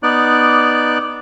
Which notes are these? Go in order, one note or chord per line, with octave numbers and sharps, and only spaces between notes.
B3 D#4 D5 D6 F#6